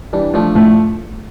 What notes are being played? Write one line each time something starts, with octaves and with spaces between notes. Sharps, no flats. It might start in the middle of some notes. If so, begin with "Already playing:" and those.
E3 G3 D4
F3 A3 D4
A2 F3 A3